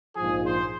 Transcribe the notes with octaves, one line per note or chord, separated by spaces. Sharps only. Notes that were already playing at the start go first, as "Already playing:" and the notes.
A#1 G#2 F3 G#4
C5